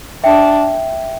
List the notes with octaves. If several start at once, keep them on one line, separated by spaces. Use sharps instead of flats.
D4 E5 G5